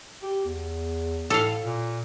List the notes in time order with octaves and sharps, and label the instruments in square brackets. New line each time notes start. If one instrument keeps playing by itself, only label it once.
[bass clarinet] G4
E2
[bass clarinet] A2 [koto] A4 F5
[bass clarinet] A#2